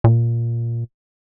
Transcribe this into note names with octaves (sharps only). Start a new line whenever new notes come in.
A#2